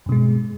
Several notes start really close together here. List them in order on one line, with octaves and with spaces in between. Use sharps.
G2 B2 G#3